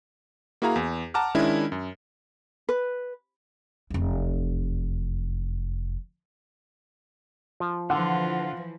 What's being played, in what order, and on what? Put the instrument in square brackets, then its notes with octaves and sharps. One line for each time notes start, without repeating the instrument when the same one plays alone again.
[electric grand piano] A#3 E4 F#4 G#4 F5 A#5
E2
F#5 A5 A#5 D6 F6
D#3 G#3 C#4 D4 E4
F#2
[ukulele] B4
[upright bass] F1 E2
[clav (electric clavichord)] F3
[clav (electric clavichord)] D3 [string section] E3 F3 [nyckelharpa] F4 [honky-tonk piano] F#5